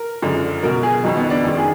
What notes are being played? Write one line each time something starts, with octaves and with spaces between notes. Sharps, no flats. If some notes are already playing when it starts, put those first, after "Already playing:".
Already playing: A#4
F#2 D3 F3 G#3
B2 F#3 A#4
G#4
F2 D#3 F#3 D#4
B3
D4
F#2 D#3 G#3
G#4